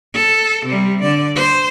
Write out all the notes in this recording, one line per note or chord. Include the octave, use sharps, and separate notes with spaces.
A4
C3 G3
D3 D5
C5